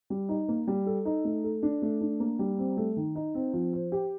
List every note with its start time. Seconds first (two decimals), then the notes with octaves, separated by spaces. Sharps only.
0.10 G3
0.29 D#4
0.49 A#3
0.67 G3
0.86 A4
1.05 D#4
1.24 A3
1.44 A4
1.63 D4
1.82 A3
2.01 D4
2.20 A#3
2.39 G3
2.58 C4
2.77 A3
2.97 D#3
3.15 D#4
3.35 C4
3.53 F3
3.73 C5
3.92 G4